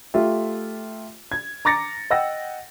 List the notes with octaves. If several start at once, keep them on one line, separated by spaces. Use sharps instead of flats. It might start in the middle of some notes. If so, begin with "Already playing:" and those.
A3 F4 G4 E5
G#6
A#5 D6 A6 A#6 C#7
D#5 F#5 G5 E6 A#6